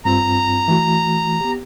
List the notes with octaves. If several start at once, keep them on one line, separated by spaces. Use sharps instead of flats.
G2 C4 F4 A#5
E3 A3 F#4
B3 G4